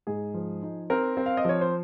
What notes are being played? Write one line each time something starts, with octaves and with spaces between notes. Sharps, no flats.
G#2 G#4
F3
D#4
C4 A#4
C4
F5
D#5
F3 C#5
C5